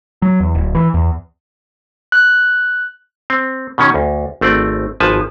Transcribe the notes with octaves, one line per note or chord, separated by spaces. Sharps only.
F#3
E2
D1
E3
E2
F#6
C4
B2 D#3 C#4
D2
G#1 A3 C4 D5
G#1 F3 B4 G#5 A5